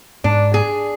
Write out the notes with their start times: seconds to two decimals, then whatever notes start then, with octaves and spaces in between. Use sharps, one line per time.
0.24 G#2 D4
0.54 G#4